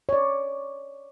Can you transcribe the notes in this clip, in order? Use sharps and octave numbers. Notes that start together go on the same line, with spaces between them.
C#5 D5